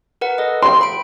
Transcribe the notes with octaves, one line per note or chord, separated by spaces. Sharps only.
A#4 B4 F#5
A4 D#5
G5 C6
B5 D7